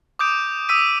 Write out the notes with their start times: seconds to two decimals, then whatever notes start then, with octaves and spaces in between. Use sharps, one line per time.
0.19 D6 D#6 G6 D7
0.69 D#6 E6 B6 D#7